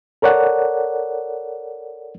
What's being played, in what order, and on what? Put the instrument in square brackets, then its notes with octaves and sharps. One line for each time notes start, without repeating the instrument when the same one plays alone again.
[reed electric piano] A4 A#4 C#5 D5 F#5